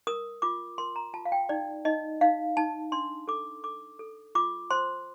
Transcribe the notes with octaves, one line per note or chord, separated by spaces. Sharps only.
A#4 D#6
F4 D6
A#4 C6
A#5
F4 A5
F5
G5
D#4 D5
D#4 D#5
D#4 F5
D#4 A5
D4 C6
A4 D6
A4 D6
A4
F4 D6
C5 C6